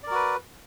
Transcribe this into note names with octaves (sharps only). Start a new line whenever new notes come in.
F#4 A#4 B4 D5